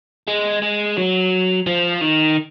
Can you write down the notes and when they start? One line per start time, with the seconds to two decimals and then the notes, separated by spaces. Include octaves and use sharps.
0.28 G#3
0.62 G#3
0.97 F#3
1.67 F3
2.01 D#3